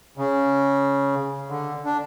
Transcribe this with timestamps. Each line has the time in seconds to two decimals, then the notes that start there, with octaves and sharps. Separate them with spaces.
0.18 C#3
1.50 D3
1.85 D4